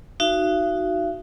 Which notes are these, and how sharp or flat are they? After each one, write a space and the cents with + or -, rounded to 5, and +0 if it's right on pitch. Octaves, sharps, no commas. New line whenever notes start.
D#4 +0 F#4 +0 F5 -45